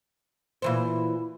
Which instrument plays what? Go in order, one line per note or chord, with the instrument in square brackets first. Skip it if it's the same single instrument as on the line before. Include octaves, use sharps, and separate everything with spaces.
[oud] A#2 E3 C5